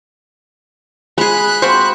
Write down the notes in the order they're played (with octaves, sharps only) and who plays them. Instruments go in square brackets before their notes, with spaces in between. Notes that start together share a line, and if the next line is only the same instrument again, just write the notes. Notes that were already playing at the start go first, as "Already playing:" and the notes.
[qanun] G#3 G#4 [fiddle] B5 F#6
[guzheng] C4 F4 F#4 [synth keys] C5 [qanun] C#6